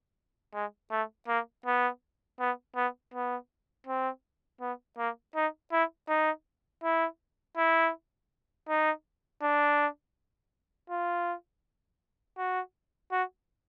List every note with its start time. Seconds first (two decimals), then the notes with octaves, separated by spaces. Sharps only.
0.54 G#3
0.91 A3
1.28 A#3
1.66 B3
2.40 B3
2.76 B3
3.14 B3
3.87 C4
4.61 B3
4.98 A#3
5.36 D#4
5.72 E4
6.09 D#4
6.84 E4
7.57 E4
8.69 D#4
9.43 D4
10.90 F4
12.38 F#4
13.12 F#4